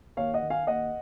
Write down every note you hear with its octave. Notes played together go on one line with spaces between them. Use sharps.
D#2 C#5 F5
D#5 F#5
D#3
F5 G#5
D#2 D#5 F#5